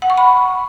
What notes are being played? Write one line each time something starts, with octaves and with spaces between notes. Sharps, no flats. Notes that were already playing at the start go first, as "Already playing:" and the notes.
F#5
C#6
B5